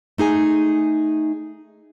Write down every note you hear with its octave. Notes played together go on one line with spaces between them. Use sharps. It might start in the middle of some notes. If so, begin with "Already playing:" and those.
A3 D#4 G#4 G#5